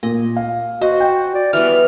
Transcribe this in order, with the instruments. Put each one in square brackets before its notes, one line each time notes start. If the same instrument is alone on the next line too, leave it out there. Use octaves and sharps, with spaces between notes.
[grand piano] A#2 [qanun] D#5
[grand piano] F5
[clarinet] F#4 [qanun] C5 [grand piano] D#5
[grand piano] G5
[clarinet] D5
[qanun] E3 G3 B3 [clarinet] F6